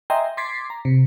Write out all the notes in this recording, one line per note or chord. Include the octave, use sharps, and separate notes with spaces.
D#5 E5 G5 G#5 A#5 C6
C6 D6 G#6 A6 B6 C7
A#5
C3